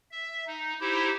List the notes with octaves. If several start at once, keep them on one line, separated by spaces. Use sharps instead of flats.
E5
D#4
D#4 E4 G4 C5